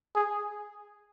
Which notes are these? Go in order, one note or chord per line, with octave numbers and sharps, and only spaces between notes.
G#4